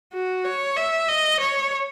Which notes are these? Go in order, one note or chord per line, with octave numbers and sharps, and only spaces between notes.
F#4
C#5
E5
D#5
C#5